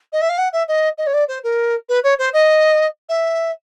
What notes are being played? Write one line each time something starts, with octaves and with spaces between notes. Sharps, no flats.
D#5
E5
F5
F#5
E5
D#5
D#5
C#5
D5
C5
A#4
B4
C#5
C5
D#5
E5